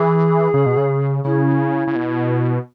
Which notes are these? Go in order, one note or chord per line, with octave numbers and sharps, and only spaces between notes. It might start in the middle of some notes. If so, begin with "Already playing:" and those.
Already playing: E3 G#4
C#3
B2
C#3
C#3 E4
C#3
B2